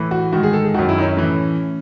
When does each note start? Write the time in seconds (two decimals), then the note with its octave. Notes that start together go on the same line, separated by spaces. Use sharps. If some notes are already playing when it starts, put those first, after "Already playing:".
Already playing: A2 E3
0.11 F#4
0.32 G#2 D#3 F#4
0.43 G#4
0.53 A4
0.64 G#4
0.74 F#2 D#3 F#4
0.89 E4
0.98 D#4
1.02 C#4
1.17 A2 E3